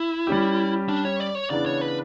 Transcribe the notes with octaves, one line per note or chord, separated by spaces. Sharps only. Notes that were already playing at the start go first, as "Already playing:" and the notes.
Already playing: E4
G3 C#4 G4
D4
C#5
D5
C#5
C#3 E3 B3 D4 D5
C#5
B4